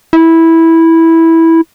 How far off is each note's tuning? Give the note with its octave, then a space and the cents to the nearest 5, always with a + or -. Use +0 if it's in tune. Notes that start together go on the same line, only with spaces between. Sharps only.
E4 -10